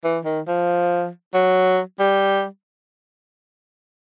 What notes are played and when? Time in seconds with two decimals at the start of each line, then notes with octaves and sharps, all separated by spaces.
0.04 E3
0.25 D#3
0.48 F3
1.34 F#3
1.99 G3